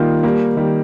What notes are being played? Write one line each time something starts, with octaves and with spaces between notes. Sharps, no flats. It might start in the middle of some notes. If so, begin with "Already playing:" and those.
Already playing: D#3 G3 A#3 F4
G3 A#3
D#3 G3